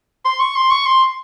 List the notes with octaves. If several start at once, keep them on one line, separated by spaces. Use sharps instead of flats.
C6
C#6
C6
C#6
C6